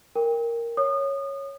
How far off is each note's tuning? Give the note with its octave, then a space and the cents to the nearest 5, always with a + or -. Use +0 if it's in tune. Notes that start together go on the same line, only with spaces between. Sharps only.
A#4 +0 G5 +25
C#5 -5 D#6 -30